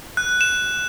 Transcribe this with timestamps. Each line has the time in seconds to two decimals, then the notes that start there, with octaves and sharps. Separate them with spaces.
0.17 F#6
0.41 E7